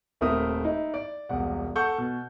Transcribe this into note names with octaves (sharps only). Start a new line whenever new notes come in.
D#1 A3 C4 E4 A#4 D#6
D#4 E4
D5
E1 C2 F#5
A4 F#5 C#6 G6
B2